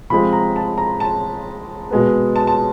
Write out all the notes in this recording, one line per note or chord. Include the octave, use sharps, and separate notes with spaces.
C3 F3 G#3 C4 B5
A#5
A5
A#5
A5
B2 G#3 B3
A5
A5